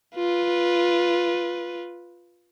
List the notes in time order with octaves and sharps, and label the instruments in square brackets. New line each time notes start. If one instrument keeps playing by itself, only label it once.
[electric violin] F4 B4